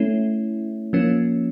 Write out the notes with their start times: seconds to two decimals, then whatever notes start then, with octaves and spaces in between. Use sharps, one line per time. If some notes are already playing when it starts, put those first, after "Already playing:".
Already playing: A3 C#4 E4
0.93 F3 A#3 C#4